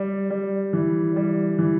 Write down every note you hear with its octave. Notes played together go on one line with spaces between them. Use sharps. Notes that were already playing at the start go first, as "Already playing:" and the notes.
Already playing: G3
G3
E3
G3
E3